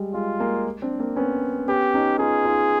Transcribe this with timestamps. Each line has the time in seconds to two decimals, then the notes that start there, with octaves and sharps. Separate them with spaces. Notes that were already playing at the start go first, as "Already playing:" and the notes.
Already playing: G3 G#3
0.14 G#3 F4
0.40 G#3 A#3
0.82 C4 D4
1.00 A#3 C4
1.16 B3 C#4
1.68 B3 C#4 G4
1.94 C#4 D#4
2.19 D#4 F4 G#4
2.45 D#4 F4